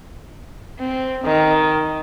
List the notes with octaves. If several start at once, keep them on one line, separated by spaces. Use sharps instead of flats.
C4
D#3